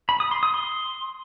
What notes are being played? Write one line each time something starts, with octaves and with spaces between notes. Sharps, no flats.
B5
D#6
C6
D#6
C6